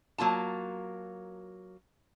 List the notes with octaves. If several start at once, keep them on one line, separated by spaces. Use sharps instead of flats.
F#3 A#3 F4 A5